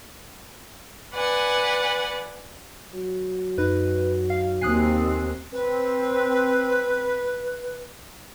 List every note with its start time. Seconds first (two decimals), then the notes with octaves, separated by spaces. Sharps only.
1.14 B4 D5 F#5 G#5
2.93 F#3
3.58 F#2 D#4 B4
4.30 F5
4.61 D#2 C4 G#5 D#6 F#6 C7
5.52 C4 B4